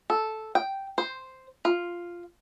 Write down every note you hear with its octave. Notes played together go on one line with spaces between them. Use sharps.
A4
G5
C5
F4